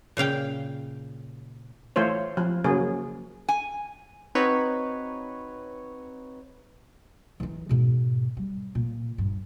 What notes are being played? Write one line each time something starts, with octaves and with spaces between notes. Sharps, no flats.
A#2 C#3 F5 G5
E3 A3 F4 C5 C#5
F3
C#3 F#3 A#3 G#4
G#5
C4 D#4 F#4 B4 C#5
E3 D#4
G#2 B2
G3
A#2
G2